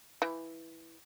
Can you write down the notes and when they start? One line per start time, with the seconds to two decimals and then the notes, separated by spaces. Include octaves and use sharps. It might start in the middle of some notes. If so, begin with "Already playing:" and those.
0.22 E3